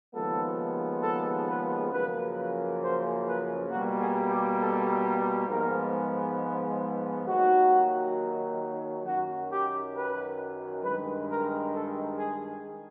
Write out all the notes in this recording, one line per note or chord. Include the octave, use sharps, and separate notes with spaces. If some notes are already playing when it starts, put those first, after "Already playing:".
D#2 C#3 F3 G#3 B3 A4
A4
B4
F#2 C#3 F3 A#3 B4
B4
C5
B4
B2 G3 A#3 F#4
G#4
G4
A4
G#2 F3 G#3 B3 A#4
D#2 D#3 F#3 F#4
F#2 D#3 F#3 F#4
G4
B4
G2 D#3 G#3 B4
A#4
A4
G#4